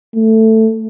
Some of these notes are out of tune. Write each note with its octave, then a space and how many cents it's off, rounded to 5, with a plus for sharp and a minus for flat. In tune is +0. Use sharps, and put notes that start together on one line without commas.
A3 +10